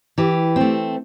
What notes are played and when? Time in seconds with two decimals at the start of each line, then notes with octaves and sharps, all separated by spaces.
0.18 E3 G4
0.56 A3 C4